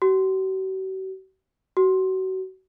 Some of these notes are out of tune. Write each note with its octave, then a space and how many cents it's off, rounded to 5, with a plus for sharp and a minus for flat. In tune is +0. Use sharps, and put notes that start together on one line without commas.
F#4 +45
F#4 +30